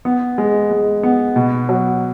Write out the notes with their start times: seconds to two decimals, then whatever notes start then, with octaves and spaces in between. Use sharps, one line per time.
0.05 B3
0.38 G#3
0.71 G#3
1.03 B3
1.36 B2
1.69 F#3